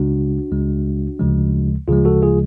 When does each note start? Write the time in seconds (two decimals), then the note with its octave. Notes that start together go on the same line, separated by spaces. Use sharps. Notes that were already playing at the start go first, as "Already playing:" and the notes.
Already playing: C#2 C#3 G#3 D4 F#4
0.52 C#2 C#3 G#3
1.20 D2 C#3 F3 G#3
1.88 D2 C#3 F3 G#3 F4 G#4
2.05 F#4 A4
2.22 F4 G#4